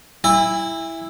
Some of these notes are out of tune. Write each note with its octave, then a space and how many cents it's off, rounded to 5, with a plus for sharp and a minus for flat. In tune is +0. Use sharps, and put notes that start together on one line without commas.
E4 +0 G#5 -40